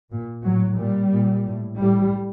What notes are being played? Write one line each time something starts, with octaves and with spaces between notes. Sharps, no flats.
A#2
A2 F#3
A#2 G3
A#2
A2
A2 G3